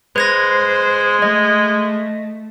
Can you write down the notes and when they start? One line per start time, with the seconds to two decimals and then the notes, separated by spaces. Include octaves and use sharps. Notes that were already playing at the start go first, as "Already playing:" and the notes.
0.16 G#3 B4 C5 G#6 A#6
1.22 A3 D#5